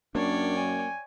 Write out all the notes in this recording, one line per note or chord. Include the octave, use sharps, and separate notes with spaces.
F#2 A#3 D4 C#5 D5 G5
G#5